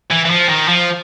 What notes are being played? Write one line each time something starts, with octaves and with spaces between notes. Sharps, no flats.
E3
E3
F3
D#3
F3